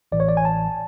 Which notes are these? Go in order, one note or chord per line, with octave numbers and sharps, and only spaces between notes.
A1 A2 E3 D5
C#5
D5
G#5
A5